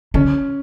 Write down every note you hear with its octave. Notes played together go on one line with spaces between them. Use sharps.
D3 C#4